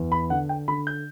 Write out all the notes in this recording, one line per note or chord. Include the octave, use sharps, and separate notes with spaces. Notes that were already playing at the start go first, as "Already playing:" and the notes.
Already playing: E2
B5
D3 F#5
G5
D3 B5
G6